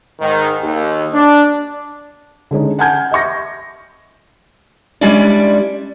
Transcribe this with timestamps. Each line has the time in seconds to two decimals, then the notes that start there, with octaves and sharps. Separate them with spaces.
0.20 G#2 D#3
0.62 D#2
1.13 D4
2.51 D3 G#3 C#4 D#4
2.79 F#5 G#5 A5 F6 G6 G#6
3.11 D#5 E5 C#6 A#6
5.01 G3 G#3 C#4 D4 E4 D5